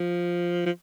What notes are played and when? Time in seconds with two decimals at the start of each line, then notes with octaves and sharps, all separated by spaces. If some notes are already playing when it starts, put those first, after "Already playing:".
Already playing: F3
0.66 F3